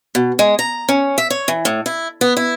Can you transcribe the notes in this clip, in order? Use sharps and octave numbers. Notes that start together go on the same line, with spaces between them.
B2
G#3
A#5
C#4
E5
C#5
E3
A2
E4
B3
E4